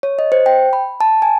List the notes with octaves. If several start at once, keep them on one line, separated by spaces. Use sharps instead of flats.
C#5
D#5
C5
G5
B5
A5
G#5